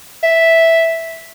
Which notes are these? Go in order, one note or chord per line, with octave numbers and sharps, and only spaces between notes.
E5